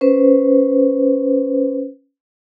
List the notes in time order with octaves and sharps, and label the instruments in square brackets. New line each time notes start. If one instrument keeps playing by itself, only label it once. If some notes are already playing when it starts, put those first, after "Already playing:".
[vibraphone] C#4 B4 C5